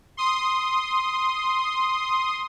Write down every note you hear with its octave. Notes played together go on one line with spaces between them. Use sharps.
C6 D#6